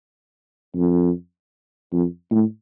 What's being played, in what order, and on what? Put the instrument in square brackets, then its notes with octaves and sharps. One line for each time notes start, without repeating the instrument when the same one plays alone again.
[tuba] F2
F2
A2